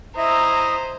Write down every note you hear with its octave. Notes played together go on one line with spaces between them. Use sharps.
E4 C5 D#5 E5 A#5 D#6